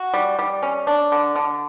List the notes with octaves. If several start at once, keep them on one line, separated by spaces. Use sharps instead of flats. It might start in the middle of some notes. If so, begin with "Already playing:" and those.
Already playing: F#4
G3
G3
C#4
D4
D3
D3